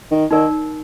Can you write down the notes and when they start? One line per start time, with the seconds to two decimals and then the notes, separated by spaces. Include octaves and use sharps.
0.11 D#3
0.31 D#3 D#4 A#4 D5